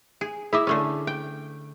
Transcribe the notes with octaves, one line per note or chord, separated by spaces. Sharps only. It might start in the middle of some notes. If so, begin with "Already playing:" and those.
G#4
E4 G#4 D#5 E5 D6
D3 A3 C#4
G5